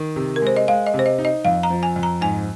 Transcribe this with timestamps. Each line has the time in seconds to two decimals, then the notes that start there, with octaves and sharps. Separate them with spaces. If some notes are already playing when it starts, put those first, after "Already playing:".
Already playing: D#3
0.16 C3
0.36 A#4
0.42 G#3 C5
0.56 D#5
0.68 G#3 F5
0.86 D#5
0.94 C3
0.99 C5
1.06 D#5
1.19 D#4
1.25 D#5
1.45 F2 F5
1.63 A#5
1.70 F3
1.83 G#5
1.96 F2
2.03 A#5
2.21 G#2 G#5